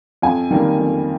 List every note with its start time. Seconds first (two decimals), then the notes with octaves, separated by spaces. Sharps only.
0.22 F2 G#5
0.51 D#3 G3 A#3
0.79 F2